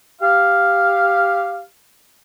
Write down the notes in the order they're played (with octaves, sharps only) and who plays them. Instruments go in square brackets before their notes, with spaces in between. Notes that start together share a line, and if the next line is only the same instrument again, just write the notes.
[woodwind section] G4 F5